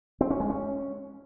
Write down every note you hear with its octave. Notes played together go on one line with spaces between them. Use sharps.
C4
C#4
G#3
C#4